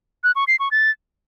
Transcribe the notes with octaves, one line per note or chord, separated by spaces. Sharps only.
F#6
C#6
C7
C#6
A6